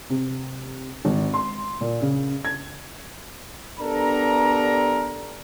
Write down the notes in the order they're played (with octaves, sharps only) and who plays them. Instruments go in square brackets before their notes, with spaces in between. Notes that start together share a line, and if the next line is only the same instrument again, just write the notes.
[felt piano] C3
G#1
C6
A#2
C#3
G#6
[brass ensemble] B3 D4 G4 A4 A#4 A#5